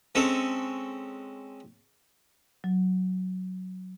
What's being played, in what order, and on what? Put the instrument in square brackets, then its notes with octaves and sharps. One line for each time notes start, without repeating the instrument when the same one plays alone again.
[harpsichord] G#3 C4 C#4 A4 C#5
[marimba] F#3